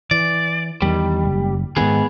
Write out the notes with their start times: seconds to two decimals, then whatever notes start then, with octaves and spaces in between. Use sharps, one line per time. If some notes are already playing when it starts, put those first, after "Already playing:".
0.11 E3 D5
0.82 E2 D#3 G3
1.25 F#1
1.77 G#2 D#3 B3 G#4